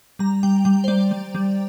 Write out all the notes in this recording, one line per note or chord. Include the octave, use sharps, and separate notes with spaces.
G3 A#5
G3 G5
G3 G5
C5
G3 D5
G3
G3